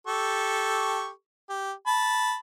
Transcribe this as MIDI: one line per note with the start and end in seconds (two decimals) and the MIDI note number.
0.07 1.09 67
0.07 1.09 69
0.07 1.09 85
1.49 1.72 67
1.87 2.35 81
1.87 2.35 83